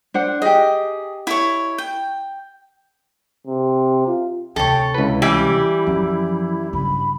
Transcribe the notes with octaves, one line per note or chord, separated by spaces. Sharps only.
D4 C5 F#5
G4 G#4 D#5
E4 C#5
G5
C3
F4
D2 C3 A4 C#5 G5
C#2 E4 B4
E3 G3 G4
F#2 F3
G2 C#3 B5